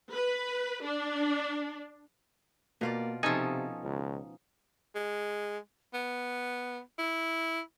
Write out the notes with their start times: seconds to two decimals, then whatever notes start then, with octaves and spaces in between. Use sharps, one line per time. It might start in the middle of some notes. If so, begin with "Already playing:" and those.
0.13 B4
0.84 D4
2.81 B2 A#3 F4 D5
3.23 C3 F3 C#4 D#4 A4 D#5 G#5
3.84 C#2
4.95 G#3
5.94 B3
6.99 E4